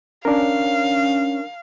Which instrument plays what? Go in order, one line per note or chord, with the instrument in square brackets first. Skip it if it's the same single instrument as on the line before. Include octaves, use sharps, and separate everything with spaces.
[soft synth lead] C#4 [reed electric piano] D4 A#4 [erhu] F5